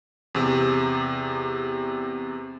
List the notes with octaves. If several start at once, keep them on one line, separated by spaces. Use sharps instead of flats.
E2 C3